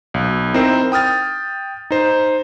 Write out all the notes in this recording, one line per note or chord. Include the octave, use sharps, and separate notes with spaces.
B1
C4 D#4 E4 A#4 C5
G5 D#6 F6 A6
D#4 C5